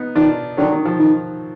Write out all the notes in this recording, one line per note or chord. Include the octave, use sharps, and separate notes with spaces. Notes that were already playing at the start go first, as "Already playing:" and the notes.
Already playing: B3 D#4
D#3 D4 F4
D3 D#3 F#3
D#3
F3
D#3